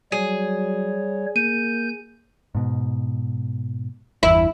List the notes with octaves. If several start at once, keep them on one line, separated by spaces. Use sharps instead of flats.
F#3 G3 G#4 C#5
A#3 G6 D#7
G#2 B2
G1 E2 E4